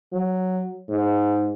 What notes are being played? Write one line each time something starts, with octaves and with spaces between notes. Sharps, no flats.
F#3
G#2